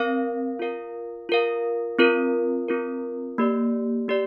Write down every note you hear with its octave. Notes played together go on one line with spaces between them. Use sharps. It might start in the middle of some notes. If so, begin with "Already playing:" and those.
Already playing: C4 A#4 F5
F4 A#4 F5
F4 A#4 F5
C4 F4 A#4
C4 F4 A#4
A#3 G4 D5
A#3 G4 D5